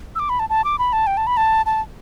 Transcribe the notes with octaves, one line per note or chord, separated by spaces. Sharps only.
E6
D6
B5
A5
A5
D6
B5
A5
G5
A5
B5
A5
A5